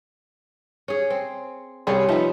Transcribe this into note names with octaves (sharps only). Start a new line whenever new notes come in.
C#4 G#4
C4
C2 G3 C#4 G#4 C6
F3 B3 D#4 E5